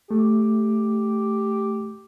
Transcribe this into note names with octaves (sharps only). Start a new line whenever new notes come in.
A3 G4